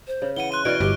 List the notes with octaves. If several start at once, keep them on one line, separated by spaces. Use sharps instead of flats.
C5
C#3
E3 F#5 D#7 G7
C6 F#6 D#7
B2 E3 C#5 D5 C#6 F6 D7
G1 G4